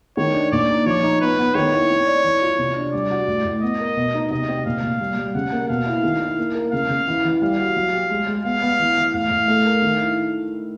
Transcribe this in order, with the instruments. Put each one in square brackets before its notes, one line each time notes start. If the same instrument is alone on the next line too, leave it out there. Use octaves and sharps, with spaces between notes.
[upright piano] D#3 [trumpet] C#5
[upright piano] D4
[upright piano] A#2 [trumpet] D5
[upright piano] D#4
[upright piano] F3 [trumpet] C#5
[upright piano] D#4
[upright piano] B3 [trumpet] B4
[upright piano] B3
[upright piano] D#3 [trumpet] C#5
[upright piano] E4
C4
D5
E3
F4
C3
D4
[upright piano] G3 [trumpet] D5
[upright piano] F#4
A2
A2
[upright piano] B3 [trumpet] D#5
[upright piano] A#4
B2
D#4
[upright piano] C3 [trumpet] D#5
[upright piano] C4
[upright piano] A#2 [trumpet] F5
[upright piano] A#2
G3
G3
[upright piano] C#3 [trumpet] F#5
[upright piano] A#3
[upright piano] B2 [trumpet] F5
[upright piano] E4
D#3
E4
A#3
A#4
[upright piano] C#3 [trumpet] F5
[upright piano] C#3
E3
E3
[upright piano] G3 [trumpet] F5
[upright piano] F#4
F#3
G4
G#3
G#3
[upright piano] B3 [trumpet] F5
[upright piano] B3
E3
E3
[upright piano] A2 [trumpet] F5
[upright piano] A2
A3
A#4
D#3
E4